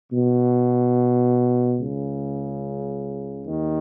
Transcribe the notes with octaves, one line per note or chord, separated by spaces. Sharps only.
B2
C#2 C#3
D#2 D#3